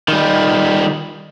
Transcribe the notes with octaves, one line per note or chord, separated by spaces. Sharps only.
D#3 G3